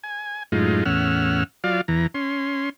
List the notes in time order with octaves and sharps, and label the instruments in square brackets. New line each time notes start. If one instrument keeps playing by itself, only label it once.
[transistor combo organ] G#5
F#2 A2 G#3 D#4 F4
E2 A2 C#4 F#5 E6 F6
F#3 F4 D5 F5
E2 E3 A#5
C#4 C6